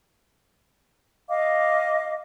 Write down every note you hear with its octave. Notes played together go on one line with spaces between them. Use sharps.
D#5 F5 D6